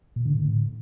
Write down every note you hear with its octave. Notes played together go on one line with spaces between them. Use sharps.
A#2
D3
A2